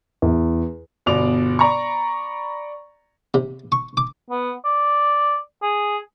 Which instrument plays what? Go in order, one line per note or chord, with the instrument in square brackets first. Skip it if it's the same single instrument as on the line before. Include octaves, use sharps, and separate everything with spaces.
[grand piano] E2
G1 B2 D5 D6 F7
D5 A#5 B5 C#6
[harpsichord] C3
C#6
D6
[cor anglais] B3
D5
G#4